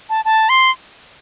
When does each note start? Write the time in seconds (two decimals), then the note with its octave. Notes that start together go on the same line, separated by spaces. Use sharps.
0.10 A5
0.25 A5
0.49 C6